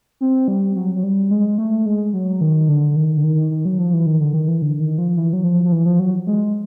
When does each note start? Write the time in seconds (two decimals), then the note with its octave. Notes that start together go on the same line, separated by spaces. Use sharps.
0.21 C4
0.48 G3
0.76 F#3
0.96 F#3
1.03 G3
1.31 G#3
1.58 A3
1.86 G#3
2.13 F#3
2.41 D#3
2.68 D3
2.96 D#3
3.17 D3
3.24 D#3
3.51 D#3
3.65 F#3
3.79 F3
3.93 E3
4.06 D#3
4.20 D3
4.34 D#3
4.48 E3
4.62 D3
4.80 D#3
4.98 F3
5.17 E3
5.33 F#3
5.44 F3
5.65 F3
5.72 E3
5.86 F3
5.99 F#3
6.27 G#3